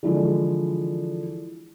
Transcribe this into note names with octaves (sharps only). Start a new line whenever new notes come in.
D3 E3 F3 G#3